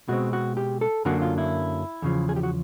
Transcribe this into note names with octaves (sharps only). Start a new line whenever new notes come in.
B2 G#3 C4 F#4
F#4
G4
A4
F#2 D3 F#3 A#3 D4 F#4
F4
E4
E2 C#3 F3
G#4
G4
F#4